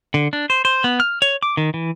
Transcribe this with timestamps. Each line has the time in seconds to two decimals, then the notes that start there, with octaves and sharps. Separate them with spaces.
0.14 D3
0.33 D4
0.50 C5
0.65 C5
0.84 B3
1.00 F6
1.22 C#5
1.43 D6
1.57 D#3
1.74 E3